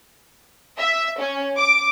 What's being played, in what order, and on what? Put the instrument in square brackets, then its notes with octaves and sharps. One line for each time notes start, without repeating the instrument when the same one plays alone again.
[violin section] E5
C#4
D6